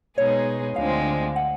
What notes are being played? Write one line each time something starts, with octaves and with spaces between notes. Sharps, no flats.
B2 G#3 B3 D#4 G#4 C#5
D2 D3 F3 G#3 C4 F5
F#5